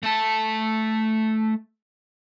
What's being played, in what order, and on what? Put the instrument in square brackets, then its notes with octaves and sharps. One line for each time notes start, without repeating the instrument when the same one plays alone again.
[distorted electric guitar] A3 A5